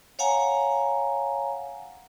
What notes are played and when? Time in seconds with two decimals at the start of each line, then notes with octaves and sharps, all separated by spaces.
0.19 C#5 F5 F#5 G#5 A#5